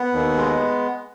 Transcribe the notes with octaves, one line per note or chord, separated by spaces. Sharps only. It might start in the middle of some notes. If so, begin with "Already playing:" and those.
Already playing: B3
D#2
G#3